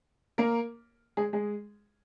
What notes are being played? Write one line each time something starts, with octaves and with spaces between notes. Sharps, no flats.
A#3 A#4
G#3 G#4
G#3 G#4